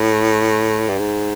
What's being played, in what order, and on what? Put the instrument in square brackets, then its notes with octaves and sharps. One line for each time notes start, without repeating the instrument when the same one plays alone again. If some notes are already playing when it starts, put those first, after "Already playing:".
Already playing: [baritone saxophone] A2
G2
G#2